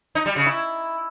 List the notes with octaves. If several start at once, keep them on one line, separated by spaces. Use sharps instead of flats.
D#4
G3
C#3
E4